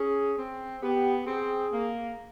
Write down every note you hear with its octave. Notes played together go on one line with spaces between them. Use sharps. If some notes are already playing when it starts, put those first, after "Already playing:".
Already playing: C#4 G#4
C4
B3 G4
C4 G#4
A#3